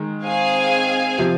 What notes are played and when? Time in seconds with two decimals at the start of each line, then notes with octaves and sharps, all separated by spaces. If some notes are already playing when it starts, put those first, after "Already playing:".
Already playing: D#3 G#3
0.24 C4 G#4 F5 G#5
1.18 C3 F3